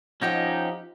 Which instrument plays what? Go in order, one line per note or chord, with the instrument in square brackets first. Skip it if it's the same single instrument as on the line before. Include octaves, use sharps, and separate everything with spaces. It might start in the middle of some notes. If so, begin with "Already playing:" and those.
[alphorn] F3 [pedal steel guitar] C#4 D#4 G4 [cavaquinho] D#5 F#5 G5